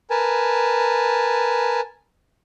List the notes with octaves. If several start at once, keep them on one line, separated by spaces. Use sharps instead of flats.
A#4 B4 G#5 A5